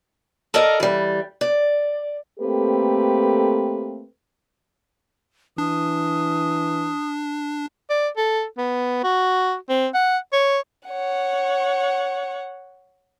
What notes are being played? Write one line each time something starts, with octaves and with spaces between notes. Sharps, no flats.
A4 A#4 D5 D#5 F5
E3 G3
D5
A3 A#3 C4 G4 A4 B4
E3 D4 D#6
D5
A4
B3
F#4
C4
F#5
C#5
C#5 F#5